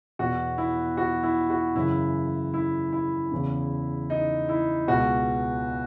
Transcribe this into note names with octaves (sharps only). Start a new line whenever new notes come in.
E2 B2 F#4
E4
F#4
E4
F#4
F#2 C#3 E3 E4
E4
E4
E2 C#3 E3
D#4
E4
C#2 B2 F#4